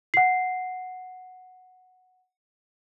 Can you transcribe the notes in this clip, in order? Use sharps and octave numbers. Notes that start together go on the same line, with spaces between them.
F#5 C7